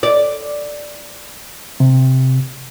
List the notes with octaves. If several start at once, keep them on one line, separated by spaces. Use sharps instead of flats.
D5
C3